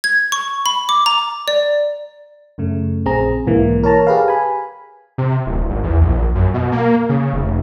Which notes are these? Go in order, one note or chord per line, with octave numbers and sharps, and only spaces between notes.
G#6
C#6
B5
D6
A#5
D5
F#2 C#3 A3
A#1 C4 G#4 A#5
B1 G#2 E3 A#3
A#4 C#5 A5 A#5
G4 G#4 B4 F5
G#5 B5
C3
D1
G#1
E2
A#1
F#2
B2
A#3
C#3
F1